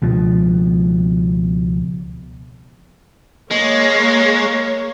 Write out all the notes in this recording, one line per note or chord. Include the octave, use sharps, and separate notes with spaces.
C#2 B2 F3
G#3 A#3 C#5